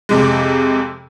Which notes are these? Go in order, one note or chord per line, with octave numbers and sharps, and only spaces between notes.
F2 C3 G#3